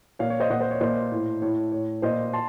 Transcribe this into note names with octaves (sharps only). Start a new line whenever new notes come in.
A#2 C#5 F5
C#5
C5 D#5
A#2 D#5 F#5
C5 D#5
C#5
A#2 C5 D#5
A2
A2 C#5
A2 C#5
A#2 C5 D#5
A5 C6